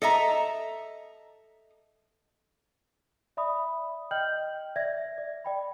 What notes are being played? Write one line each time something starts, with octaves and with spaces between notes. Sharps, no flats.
A4 D#5 E5 A#5
D5 E5 B5 D#6
D#5 G5 F6 G6 F#7
D5 E5 G#6 A#6
D5
D5 G5 B5